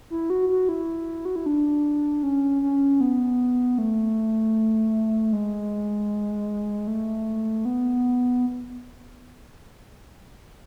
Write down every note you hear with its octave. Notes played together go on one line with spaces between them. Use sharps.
E4
F#4
F#4
E4
F#4
E4
D4
C#4
C#4
B3
A3
G#3
A3
B3